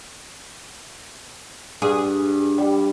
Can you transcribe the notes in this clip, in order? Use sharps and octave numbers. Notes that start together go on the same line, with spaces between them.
G2 G#4
G3